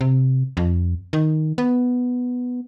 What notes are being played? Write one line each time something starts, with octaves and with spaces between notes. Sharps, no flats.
C3
F2
D#3
B3